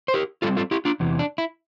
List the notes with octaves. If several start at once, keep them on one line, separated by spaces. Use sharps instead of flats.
C5
G4 A#4
A2 G3 C4 F4 A4
F4 A4
E4 G4
D4 F4
E2 C3 E3
D4
E4